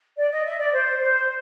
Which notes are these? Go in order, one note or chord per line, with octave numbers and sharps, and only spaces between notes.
D5
D#5
E5
D5
C5
C5